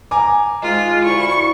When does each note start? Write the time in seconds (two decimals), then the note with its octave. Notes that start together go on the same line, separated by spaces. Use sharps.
0.11 G#5 A#5 D6
0.62 G#2 D#3 G#3 F4
1.05 D2 F3 E4 C#6